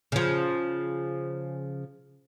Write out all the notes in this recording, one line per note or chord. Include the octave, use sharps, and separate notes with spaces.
C#3 F3